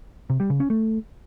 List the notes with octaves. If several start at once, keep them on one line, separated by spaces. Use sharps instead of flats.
C3
G3
C#3
C#4
A3